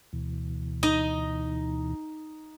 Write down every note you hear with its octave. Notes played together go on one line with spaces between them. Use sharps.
D2 B2 E3
D#4 D#5